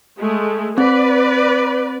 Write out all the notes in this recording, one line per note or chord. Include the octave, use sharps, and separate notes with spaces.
G#3 A3
C4 B4 D5